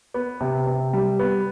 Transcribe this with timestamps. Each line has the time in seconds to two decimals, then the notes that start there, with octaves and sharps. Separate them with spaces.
0.14 B3
0.41 C3
0.67 C3
0.93 G3
1.19 B3